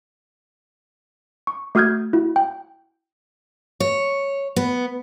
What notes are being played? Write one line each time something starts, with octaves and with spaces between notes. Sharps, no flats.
C#6
A3 F#4 D#6 F6 G6 G#6
E4 F#4
G5
C#5
B3